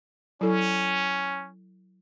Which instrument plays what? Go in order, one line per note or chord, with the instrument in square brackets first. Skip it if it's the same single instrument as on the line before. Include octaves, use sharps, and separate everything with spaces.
[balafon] F#3 E4 A4 [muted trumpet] C#4